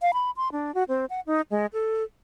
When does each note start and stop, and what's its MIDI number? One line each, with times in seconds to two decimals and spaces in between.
0.02 0.11 77
0.14 0.31 83
0.37 0.51 84
0.52 0.74 62
0.75 0.84 66
0.89 1.05 60
1.10 1.20 78
1.27 1.41 63
1.51 1.66 56
1.73 2.04 69